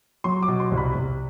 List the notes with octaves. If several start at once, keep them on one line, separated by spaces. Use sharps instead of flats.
F#3 C6
D6
B2
C6
C2
B5
C2